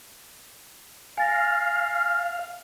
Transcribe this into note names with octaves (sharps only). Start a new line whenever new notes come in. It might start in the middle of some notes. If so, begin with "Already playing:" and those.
F5 G#5 A6 A#6